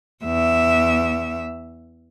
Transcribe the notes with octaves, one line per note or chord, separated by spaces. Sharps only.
E2 E5